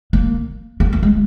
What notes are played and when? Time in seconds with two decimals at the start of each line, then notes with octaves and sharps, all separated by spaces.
0.13 A#3
0.80 A#3
0.93 A#3
1.03 G#3